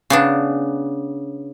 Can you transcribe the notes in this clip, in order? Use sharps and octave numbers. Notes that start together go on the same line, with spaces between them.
C#3 B3 D4